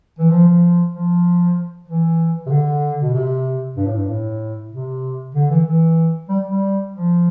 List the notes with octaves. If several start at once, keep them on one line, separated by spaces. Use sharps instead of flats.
E3
F3
F3
F3
E3
C3
D3
B2
C3
G2
A2
G2
A2
C3
D3
E3
E3
G3
G3
F3